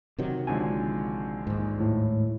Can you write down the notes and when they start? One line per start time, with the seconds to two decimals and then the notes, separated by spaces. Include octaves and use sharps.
0.19 C3 D#3 F#3
0.47 A#1 D3 G#3 G#5
1.47 D#2 G#2
1.80 A2